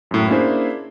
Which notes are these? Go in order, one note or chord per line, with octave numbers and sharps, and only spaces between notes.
F#2 A2
A#3 C#4 D4 E4 G#4 C5